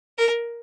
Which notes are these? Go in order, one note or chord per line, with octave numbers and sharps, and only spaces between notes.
A#4